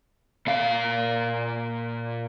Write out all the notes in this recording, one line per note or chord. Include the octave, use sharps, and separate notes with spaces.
A#2 F5